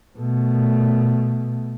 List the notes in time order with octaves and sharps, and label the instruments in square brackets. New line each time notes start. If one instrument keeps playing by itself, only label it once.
[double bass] B2 A3